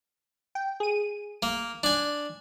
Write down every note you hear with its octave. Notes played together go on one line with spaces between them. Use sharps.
G5
G#4 D#7
A#3
D4 G#5